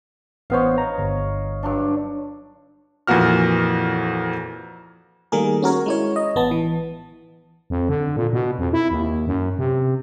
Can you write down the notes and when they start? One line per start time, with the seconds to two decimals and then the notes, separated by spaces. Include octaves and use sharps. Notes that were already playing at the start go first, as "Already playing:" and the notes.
0.50 A1 B3 C5 C#5 D#5 F5
0.78 A#5
0.98 G1
1.63 G2 F#3 D4
3.07 F2 A#2 E3 A#3 F#4 F6
5.32 D#3 G3 A3 A#3 G#4 A#4
5.62 C#4 F#4 A#4 C#5
5.86 G#3 E4 C#5
6.16 D#5
6.35 A1 B3 A5
6.51 E3
7.70 F2
7.89 D3
8.17 A#2
8.33 B2
8.59 F2
8.73 E4
8.91 D#2
9.27 F#2
9.58 C3